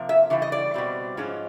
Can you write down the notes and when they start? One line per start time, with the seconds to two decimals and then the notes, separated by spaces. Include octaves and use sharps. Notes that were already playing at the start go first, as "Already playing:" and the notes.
Already playing: C3 F3 A#3
0.09 E5
0.30 C#3 E3 G3
0.42 D#5
0.52 D5
0.74 B2 G3 C4
1.17 G#2 F3 G#3 C#4